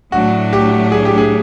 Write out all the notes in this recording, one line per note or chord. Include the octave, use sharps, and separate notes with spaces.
A2 F#3 A3 D4 F#4
G4
G#4
G4
G#4